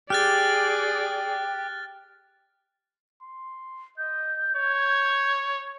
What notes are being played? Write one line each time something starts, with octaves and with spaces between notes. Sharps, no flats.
G4 G#4 D5 F6 F#6 A6
C6
D#5 G6
C#5 G#6